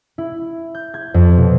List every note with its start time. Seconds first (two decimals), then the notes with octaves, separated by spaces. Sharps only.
0.18 E4
0.75 G6
0.94 G#6
1.14 F2
1.37 B2